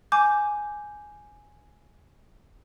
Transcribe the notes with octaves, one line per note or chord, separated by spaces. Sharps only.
G#5 D6 G6